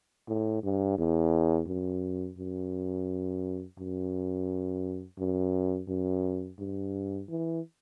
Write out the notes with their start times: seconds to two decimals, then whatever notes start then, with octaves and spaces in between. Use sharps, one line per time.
0.28 A2
0.63 G2
0.98 E2
1.68 F#2
2.38 F#2
3.78 F#2
5.19 F#2
5.88 F#2
6.59 G2
7.29 E3